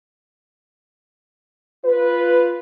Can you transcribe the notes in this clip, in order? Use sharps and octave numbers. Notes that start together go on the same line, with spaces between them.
F4 B4